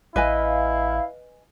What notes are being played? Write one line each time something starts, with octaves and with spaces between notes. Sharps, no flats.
A1 E4 B4 D#5 F5 G#5